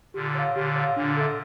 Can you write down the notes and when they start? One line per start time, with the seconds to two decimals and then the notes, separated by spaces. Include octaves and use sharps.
0.14 A#2 D3 G4
0.35 C#5 F5
0.55 A#2 D3 G4
0.76 C#5 F5
0.96 A#2 D3 D4
1.17 A4 E5